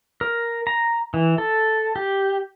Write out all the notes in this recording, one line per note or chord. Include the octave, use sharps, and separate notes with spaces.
A#4
A#5
E3
A4
G4